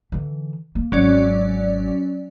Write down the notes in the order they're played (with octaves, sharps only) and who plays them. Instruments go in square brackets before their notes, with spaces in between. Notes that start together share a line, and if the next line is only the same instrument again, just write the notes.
[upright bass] D3 E3
A#3
[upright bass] G#1 [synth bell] F#3 C#4 D5